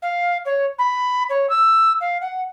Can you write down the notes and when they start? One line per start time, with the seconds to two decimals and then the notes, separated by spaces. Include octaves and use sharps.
0.02 F5
0.45 C#5
0.78 B5
1.29 C#5
1.49 E6
2.00 F5
2.21 F#5